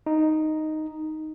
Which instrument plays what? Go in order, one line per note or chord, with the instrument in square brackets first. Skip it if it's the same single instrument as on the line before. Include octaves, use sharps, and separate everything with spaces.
[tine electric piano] D#4